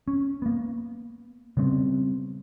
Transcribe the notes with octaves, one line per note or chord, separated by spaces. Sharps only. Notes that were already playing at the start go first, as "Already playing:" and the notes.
C#4
A#3 B3
C#3 G3 B3 C4